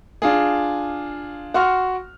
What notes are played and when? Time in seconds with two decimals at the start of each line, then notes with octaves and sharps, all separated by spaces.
0.22 D4 F4 G#4
1.54 F#4 F#5 C6 C#6 F6